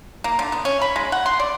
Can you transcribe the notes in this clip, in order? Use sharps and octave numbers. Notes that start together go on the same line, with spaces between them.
A#3
D3
B3
C#4
B5
G#3
F#5
C6
D5